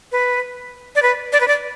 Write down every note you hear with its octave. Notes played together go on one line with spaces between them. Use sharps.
B4
D5
B4
D5
B4
D5